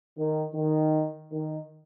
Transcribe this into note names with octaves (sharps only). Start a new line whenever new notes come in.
D#3
D#3
D#3